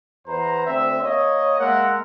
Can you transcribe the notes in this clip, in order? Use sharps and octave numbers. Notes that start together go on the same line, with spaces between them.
E2 B4 C5 A#5
D2 C4 E5
A#3 C#5 D#5
G#3 A#3 A#4 E5 F#5